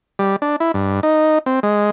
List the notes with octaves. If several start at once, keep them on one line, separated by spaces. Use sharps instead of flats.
G3
D4
E4
G2
D#4
C4
G#3